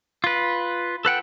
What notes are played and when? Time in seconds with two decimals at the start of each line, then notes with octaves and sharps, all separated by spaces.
0.24 F4 B4
1.05 A4 B4 F#5 G5